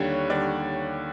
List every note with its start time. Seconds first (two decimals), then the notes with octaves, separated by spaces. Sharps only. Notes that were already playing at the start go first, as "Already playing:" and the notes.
Already playing: D#2 D3 G3 C#5
0.29 D#2 D3 G3 D5